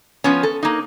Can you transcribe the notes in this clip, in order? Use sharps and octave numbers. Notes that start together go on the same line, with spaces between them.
F3 B3 C#4
A4
A#3 D#4